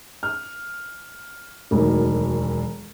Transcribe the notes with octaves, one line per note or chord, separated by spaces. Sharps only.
F6
E1 D2 D#3 F#3 A#4